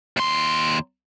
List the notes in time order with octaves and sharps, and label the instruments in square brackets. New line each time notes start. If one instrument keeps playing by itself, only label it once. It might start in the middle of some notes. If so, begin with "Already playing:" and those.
[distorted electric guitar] D#2 C6